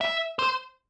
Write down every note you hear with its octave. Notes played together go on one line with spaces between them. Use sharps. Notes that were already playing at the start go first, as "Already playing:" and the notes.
E5
C5